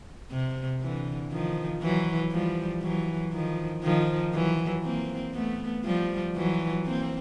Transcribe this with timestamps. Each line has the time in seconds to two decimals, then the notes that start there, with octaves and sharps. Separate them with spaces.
0.31 C3
0.81 D3 E3
1.32 D#3 F3
1.82 E3 F#3
2.32 F3 G3
2.82 E3 F#3
3.33 D#3 F3
3.83 D#3 F3
4.34 E3 F#3
4.84 A#3 C4
5.34 A3 B3
5.85 F3 G3
6.36 E3 F#3
6.86 A#3 C4